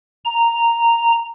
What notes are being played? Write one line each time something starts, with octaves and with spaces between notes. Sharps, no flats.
A#5